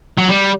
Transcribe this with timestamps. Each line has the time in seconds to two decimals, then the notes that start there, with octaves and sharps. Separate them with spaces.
0.18 F#3
0.29 G3